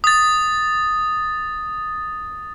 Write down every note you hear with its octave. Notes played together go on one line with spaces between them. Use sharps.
D#6 A6